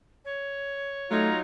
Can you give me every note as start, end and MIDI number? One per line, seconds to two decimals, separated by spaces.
0.25 1.39 73
1.11 1.40 54
1.11 1.31 57
1.11 1.40 63
1.11 1.40 65
1.11 1.39 82